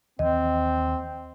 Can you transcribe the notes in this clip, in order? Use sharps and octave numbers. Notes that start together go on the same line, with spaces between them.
D#2 E3 F3 C4 D#5